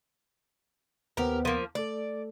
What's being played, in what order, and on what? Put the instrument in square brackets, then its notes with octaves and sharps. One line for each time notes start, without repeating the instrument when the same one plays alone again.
[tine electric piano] D#2 B3 C5 [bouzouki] G4 A#4
[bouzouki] F3 A#3
[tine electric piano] A3 A4 [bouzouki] D5